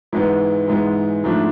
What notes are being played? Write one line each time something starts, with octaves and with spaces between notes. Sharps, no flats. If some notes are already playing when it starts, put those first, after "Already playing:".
G#2 E3 G#3 B3
G#2 E3 G#3 B3
G#2 F3 A3 D4